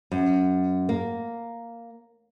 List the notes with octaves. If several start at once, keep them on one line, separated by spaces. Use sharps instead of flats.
F#2
A#3